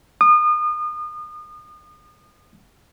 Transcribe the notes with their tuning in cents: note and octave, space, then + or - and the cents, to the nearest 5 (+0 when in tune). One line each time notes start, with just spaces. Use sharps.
D#6 -35